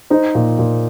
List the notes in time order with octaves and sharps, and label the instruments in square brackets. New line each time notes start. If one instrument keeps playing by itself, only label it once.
[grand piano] D#4 C5
A#2
A#2